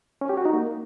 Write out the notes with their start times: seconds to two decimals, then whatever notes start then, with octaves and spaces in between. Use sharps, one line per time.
0.21 C#4
0.29 G4
0.37 F#4
0.45 D#4
0.53 A#3